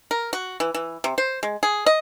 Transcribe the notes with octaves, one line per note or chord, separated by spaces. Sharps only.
A#4
F#4
E3
E3
C3
C5
G#3
G#4
D#5